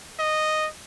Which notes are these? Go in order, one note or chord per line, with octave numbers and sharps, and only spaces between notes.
D#5